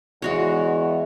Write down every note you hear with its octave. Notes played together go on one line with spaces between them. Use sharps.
E2 G#3 F#4 C#5